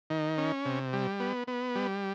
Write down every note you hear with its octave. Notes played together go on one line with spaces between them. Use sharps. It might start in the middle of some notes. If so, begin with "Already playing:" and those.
D#3
C#4
C3
G3
B3
B3
G3